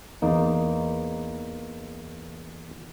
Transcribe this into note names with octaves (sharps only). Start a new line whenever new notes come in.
E2 A#3 D#4